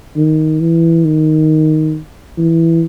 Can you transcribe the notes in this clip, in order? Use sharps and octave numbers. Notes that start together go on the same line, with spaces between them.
D#3
E3
D#3
E3